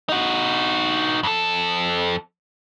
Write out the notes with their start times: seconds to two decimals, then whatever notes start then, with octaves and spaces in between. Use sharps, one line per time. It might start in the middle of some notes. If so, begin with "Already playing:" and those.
0.09 D#4 F#4
1.23 F2 A4